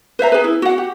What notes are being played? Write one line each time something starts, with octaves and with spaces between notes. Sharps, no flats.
B4 C5 E5 A#5
G#4 B4
E4
F#4 F#5
G4